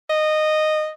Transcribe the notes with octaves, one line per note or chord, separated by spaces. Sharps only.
D#5